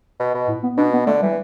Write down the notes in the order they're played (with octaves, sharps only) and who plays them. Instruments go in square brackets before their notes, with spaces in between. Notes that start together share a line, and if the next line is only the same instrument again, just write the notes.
[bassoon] B2
B2
[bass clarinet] A2
B3
[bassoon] B2 [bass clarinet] D4
[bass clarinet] B3
[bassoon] D3 [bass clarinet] A3
[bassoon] E3 [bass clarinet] G3